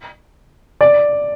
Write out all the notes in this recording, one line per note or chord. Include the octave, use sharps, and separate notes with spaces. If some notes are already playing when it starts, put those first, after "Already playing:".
D5